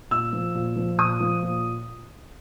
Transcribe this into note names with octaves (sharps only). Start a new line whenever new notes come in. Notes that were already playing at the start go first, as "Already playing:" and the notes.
A#2 E6
F3
A#2
F3
A#2 D#6
F3
A#2